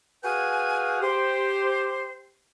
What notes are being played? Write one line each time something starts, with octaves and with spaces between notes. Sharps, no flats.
F#4 G#4 B4 F5 G5 G#5
G4 C5